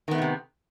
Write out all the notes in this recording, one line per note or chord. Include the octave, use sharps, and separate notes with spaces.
A2 C3 D#3 A3 B3